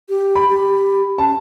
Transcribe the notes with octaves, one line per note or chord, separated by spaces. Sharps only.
G4
B5
G4
C#4 A5